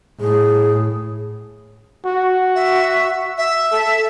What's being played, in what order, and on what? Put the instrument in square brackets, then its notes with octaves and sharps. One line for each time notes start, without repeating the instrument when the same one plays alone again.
[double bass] A2 [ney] G#4
[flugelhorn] F#4
[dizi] E5
E5
[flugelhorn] A4